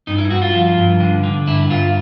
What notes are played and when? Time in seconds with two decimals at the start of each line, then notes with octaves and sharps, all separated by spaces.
0.07 G2 D#4
0.18 E4
0.31 G2 F#4
0.42 F4
0.54 F3
0.78 G2
1.00 D3
1.24 D3
1.47 G2 E4
1.70 G2 F4